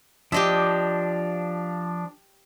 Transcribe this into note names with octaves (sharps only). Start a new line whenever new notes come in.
F3 D4 G4 D#5 E5